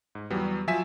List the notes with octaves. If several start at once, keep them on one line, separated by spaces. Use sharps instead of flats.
G#2
E2 F#3 G3 B3
F3 F#3 E5 G#5 B6 E7